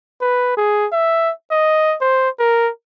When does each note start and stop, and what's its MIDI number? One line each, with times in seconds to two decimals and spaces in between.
0.21 0.53 71
0.57 0.87 68
0.92 1.31 76
1.51 1.96 75
2.01 2.29 72
2.39 2.70 70